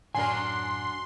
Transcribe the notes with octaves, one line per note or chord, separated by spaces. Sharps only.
F#2 A2 F#3 D4 A#4 G#5 C6